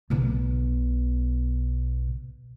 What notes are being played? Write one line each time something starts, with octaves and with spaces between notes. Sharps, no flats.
B1 B2